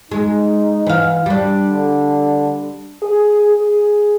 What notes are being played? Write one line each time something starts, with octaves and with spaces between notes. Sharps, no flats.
G#3 D#4
E3 F5
G3 D4
D3
G#4
G#4